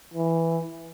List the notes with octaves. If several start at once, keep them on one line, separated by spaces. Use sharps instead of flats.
E3